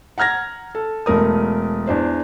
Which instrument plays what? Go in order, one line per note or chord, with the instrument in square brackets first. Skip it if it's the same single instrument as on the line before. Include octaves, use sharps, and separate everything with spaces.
[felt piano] F#5 A#5 F6 G#6 A#6
A4
E1 A3 A#4 D#6
E2 D4 C5